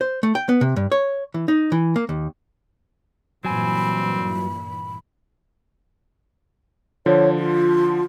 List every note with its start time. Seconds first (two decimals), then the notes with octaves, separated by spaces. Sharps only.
0.01 C5
0.23 A3
0.35 G5
0.49 B3
0.61 C3
0.76 G2
0.92 C#5
1.34 E3
1.48 D#4
1.72 E3
1.96 A#3
2.09 D#2
3.45 G2 A#2 E3 F#3 C4 G#5 B5
7.06 D3 F3 C#5
7.38 F4